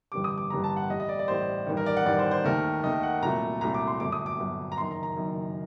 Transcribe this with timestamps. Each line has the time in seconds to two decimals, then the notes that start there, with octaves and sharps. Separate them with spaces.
0.12 A1 G2 D3 G3 D6
0.24 D#6
0.38 D6
0.50 A1 G2 D3 G3 A#5
0.64 A5
0.77 F#5
0.89 A1 A2 G3 D#5
1.00 D#5
1.09 D5
1.19 D5
1.28 A1 A2 G3 C5
1.67 A1 G2 D#3
1.77 A#4
1.86 D5
1.97 F#5
2.05 A1 G2 D#3 D5
2.19 C5
2.31 C5
2.44 D#2 D#3 A3 A#4
2.83 D#2 D#3 A3 D#5
3.03 F#5
3.22 C2 A#2 F#3 A3 A#5
3.61 C2 A#2 F#3 A3 A#5
3.74 D6
3.87 C6
4.00 G1 F#2 F#3 A3 D6
4.12 D#6
4.26 D6
4.38 G1 F#2 F#3 A3
4.72 A#5
4.77 F#1 F#2 D#3 C6
4.91 A#5
5.03 A#5
5.16 F#1 F#2 D#3